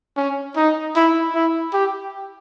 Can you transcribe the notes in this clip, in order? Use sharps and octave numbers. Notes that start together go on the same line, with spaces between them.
C#4
D#4
E4
E4
G4